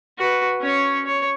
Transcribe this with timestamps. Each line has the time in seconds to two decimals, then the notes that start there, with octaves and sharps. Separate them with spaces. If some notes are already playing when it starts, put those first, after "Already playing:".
0.18 F#4 B4
0.61 C#4 C#5
1.05 C#5